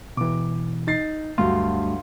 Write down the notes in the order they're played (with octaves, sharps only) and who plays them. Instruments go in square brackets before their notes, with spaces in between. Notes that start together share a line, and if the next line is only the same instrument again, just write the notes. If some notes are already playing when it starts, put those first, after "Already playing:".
[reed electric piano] B2 E3 [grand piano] D6
[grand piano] D#4 A6 C7
[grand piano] D2 G2 F#3 [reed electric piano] F5 C6